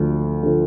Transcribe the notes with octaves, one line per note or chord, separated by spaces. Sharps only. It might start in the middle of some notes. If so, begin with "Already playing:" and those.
Already playing: D2 D3 F3 A3
D3 F3 A3